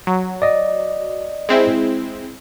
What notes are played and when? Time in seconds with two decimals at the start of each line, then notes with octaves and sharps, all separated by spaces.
0.07 F#3
0.42 D5 D#5
1.49 G#3 C4 E4